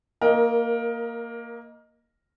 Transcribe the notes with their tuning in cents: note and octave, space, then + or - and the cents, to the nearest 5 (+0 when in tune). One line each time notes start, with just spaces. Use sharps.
A#3 -5 A#4 +20 D#5 +0